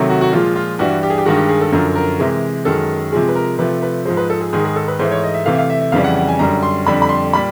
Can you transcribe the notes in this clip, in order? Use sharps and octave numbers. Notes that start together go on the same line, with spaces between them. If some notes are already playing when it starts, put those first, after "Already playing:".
Already playing: C3 D#3 F#3 A3
F#4
F#4
A#2 F3 G#3 F4
F4
G2 E3 G3 F#4
G4
G#4
G4
G2 D#3 G#3 F#4
G4
G#4
A4
F#2 D3 F3 A#4
A#4
C3 E3 G#3
F#2 D#3 G#3 A4
C3 F3 G#3 G#4
B4
A#4
C3 F3 A3 B4
B4
G#2 F3 G#3 C5
B4
A4
G#4
G#2 D#3 G#3 G#4
G#4
A4
B4
G#2 E3 A3 C5
C#5
D#5
E5
C3 E3 A3 F5
E5
F5
E5
E5
F2 C#3 E3 G3 F5
F#5
F#5
G#5
F#2 D3 G3 A#5
C6
F2 D3 G3 B5
B5
C6
A#2 G3 B5